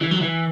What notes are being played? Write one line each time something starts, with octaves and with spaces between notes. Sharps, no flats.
E3
F#3
E3